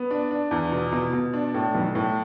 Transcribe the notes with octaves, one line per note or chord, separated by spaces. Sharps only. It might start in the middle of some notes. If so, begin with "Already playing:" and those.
Already playing: B3
D4
D4
E2
B2
B2
B2
D4
A2
B1
A2